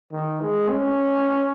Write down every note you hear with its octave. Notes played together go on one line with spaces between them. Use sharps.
D#3
G#3
C#4